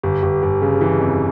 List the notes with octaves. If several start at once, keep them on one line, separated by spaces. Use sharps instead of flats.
G1 G4
G1 G4
G1 G4
C#3 G#4
E3 G4
F2